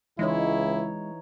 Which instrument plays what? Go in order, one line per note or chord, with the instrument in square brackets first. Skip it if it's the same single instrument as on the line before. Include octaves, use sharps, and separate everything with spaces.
[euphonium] C#2 [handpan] E3 D#4 C#5 [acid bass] G#3 [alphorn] E4